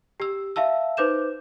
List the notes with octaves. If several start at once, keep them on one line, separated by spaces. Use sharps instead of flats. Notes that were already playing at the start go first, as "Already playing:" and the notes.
G4 E6
E5 F5 A5 E6
D#4 B4 C5 D6 G6 E7